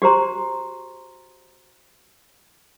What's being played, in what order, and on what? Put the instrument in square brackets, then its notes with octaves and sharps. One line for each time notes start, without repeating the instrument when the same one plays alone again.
[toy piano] F#4 G4 C5 A#5 C6